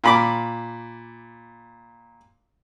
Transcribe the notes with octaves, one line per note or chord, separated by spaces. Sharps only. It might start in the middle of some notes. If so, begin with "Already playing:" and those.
A#2 B5 D6